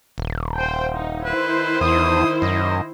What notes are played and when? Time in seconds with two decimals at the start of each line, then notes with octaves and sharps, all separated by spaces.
0.18 D#1
0.56 C5 G5
0.93 D#4
1.25 D#3 E4 B4 C5
1.81 E2 D#6
2.42 F#2 D#5